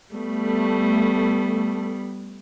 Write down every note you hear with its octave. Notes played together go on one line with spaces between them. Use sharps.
G3 A3 B3